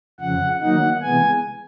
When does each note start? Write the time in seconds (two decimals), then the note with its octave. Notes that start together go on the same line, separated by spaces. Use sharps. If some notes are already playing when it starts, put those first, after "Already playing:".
0.20 F2 C#3 F3 F#5
0.61 D#3 F#3 A#3 D#4 F#5
1.02 C3 E3 G#3 B3 G#5